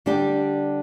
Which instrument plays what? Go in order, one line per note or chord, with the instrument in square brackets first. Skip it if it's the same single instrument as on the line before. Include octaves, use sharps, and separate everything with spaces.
[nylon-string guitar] D3 G3 D4 G4